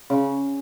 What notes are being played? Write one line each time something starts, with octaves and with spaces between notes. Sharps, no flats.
C#3